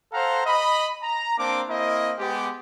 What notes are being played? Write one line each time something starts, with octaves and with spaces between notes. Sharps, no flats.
A4 C5 F5 F#5 A#5
D#5 B5
A#5
A#3 C4 D4 D6
A#3 C4 E4 D#5
G#3 B3 G4